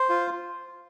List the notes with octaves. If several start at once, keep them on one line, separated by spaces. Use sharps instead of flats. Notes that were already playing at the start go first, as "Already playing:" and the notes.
Already playing: C5
F4